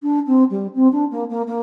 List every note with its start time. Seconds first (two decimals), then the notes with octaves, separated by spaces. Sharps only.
0.03 D4
0.27 C4
0.50 G3
0.75 C4
0.92 D4
1.11 A#3
1.30 A#3
1.47 A#3